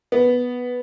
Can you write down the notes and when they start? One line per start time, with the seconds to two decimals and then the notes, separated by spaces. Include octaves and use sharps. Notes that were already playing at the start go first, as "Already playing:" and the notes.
0.12 B3